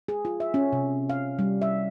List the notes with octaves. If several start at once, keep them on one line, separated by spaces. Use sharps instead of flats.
G#4
F4
E5
C#4
C3
F5
G3
E5